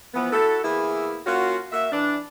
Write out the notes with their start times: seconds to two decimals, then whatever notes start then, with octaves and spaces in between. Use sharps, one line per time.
0.14 E3 F3 B3
0.33 E4 F#4 A4
0.64 E3 A#3 B3 E4 G#4
1.27 A#3 C#4 F4 F#4
1.72 A#3 F#4 E5
1.92 E3 D4